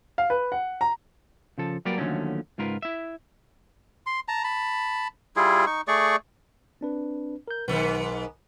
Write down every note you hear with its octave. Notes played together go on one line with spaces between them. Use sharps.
F5
B4
F#5
A#5
C#3 F3 A4
F#3 G3 A#3 A#4 B4 D5
D#2 D3 F3 F#3 A3 C#4
C#2 G#2 F4 A#4 B4
E4 E5
C6
A5 A#5
A5 B5
G3 E4 F4 G#4
D#4 C#6
A3 G#4 D5 C#6
C4 D4 B4
A#4 G6
B1 G#2 D#3 B3